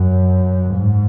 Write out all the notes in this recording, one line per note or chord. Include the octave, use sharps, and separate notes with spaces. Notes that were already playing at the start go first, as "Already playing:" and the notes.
Already playing: F#2
G#2